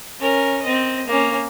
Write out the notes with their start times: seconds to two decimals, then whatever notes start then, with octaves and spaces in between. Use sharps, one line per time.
0.19 C#4 A#4
0.62 C4 D#5
1.07 A#3 C#4